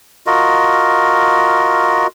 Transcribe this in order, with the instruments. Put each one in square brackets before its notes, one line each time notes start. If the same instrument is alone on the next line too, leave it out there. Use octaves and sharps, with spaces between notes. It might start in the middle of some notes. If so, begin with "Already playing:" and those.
[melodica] F4 F#4 A#4 D#5